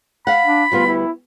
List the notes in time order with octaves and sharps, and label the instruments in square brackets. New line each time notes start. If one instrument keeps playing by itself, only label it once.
[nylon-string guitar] F5 F#5 [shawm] B5
[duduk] D4
[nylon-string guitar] D2 G3 B3 [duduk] F4
[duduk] E4